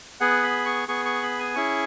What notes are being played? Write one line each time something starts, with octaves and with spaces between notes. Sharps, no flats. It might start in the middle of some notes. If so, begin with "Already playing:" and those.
B3 G#4 F#5
B5
C#6
B3 G#4 C#6
C#6
B5
G#5
C#4 E4 G#4 C#6